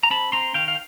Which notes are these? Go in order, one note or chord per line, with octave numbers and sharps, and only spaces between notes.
A#5
C4 A5 B5
C4 A#5 C6
D#3 F5 G5
F5